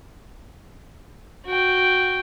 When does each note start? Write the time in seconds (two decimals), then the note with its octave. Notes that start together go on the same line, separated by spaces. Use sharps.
1.46 F#4 G5